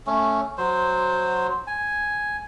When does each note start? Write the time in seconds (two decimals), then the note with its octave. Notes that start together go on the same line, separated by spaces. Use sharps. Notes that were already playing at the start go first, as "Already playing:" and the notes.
0.07 A3 C#4
0.58 F#3 C5
1.67 G#5